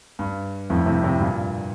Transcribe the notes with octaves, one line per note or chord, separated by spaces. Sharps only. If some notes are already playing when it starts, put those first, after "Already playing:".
G2
F2 A2
A2 C3
A2 C3
G2 A#2